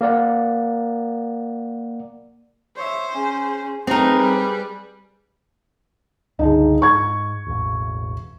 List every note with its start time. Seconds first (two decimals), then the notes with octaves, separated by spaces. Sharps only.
0.01 A#3 A#4 D5 F#5
2.77 C5 C#5 E5
3.11 C#4 G#4
3.87 A3 C4 D#4 G#4 A#4 B4
4.17 G3
6.39 C#2 G2 D3 D#4 G#4
6.82 G#2 C#6 G#6
7.46 E1 A1